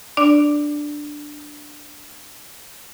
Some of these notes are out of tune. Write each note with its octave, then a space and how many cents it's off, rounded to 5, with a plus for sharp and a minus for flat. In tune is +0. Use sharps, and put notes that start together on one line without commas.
D4 +5 D5 +0